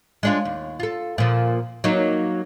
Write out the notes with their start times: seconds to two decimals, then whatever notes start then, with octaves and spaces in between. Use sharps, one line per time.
0.23 G#3 D4 F4
0.45 D#2
0.80 F4 A4
1.18 A#2 F3
1.84 F#3 A#3 D#4